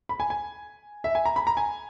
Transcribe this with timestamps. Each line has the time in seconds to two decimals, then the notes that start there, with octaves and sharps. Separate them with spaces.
0.09 B5
0.20 G#5
0.30 G#5
1.04 E5
1.15 G#5
1.25 A#5
1.36 B5
1.47 A#5
1.57 G#5